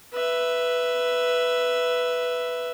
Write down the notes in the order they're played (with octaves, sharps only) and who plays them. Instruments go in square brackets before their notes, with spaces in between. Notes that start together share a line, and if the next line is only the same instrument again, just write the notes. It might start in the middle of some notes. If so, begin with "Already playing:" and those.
[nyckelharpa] B4 E5